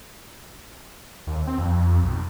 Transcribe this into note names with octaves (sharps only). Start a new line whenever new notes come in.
D#2
C4
F2
B1